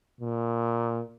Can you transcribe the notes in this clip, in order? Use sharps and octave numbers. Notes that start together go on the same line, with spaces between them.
A#2